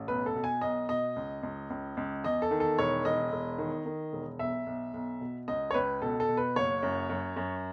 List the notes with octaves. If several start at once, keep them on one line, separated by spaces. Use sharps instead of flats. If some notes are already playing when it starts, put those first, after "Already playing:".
Already playing: A1
B1 B4
A4
B2
G#5
B1 D#5
B2 D#5
C#2
C#2
C#2
C#2
E2 D#5
A4
D#3
A4
E1 C#5
E1 D#5
E1
D#3
D#3
E1
B1 E5
B1
B1
B2
C#2 D#5
C#5
C#2 B4
B2 A4
A4
B2
B4
F#1 C#5
F#2
F#2
F#2